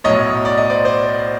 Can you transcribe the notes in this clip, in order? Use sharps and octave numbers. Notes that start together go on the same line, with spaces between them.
B1 A2 F#3 C#5 D#5
D5
D#5
C5 D5
C5 D5